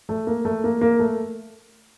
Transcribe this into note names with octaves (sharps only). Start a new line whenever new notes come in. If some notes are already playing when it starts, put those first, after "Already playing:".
A3
A#3
A3
A#3
A#3
A3